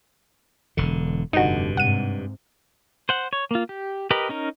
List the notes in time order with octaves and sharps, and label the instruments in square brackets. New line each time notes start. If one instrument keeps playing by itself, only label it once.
[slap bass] E1 D3
[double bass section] F1 D3 [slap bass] G2 [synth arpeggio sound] D#4 F#4
[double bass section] G#2 C3 [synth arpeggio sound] F#5 D#7
[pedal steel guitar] C5 F#5
C#5
A#3 F4
G4
G4 A#4 B4 D#5
C#4 D#4 A#4